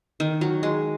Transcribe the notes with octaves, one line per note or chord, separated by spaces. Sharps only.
D#3
F#3
G#3